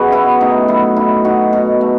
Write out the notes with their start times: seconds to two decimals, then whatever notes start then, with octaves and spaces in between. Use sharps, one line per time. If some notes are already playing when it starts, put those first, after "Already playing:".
Already playing: B2 F#3 C#4 F#4 G#4 B4
0.12 B3 E4
0.41 A2 D#4
0.68 F#3 E4
0.96 D#4 E4
1.25 D#4 F#4
1.53 B2
1.81 A3